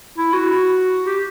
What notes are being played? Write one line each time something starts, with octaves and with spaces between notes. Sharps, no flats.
E4
F#4
G4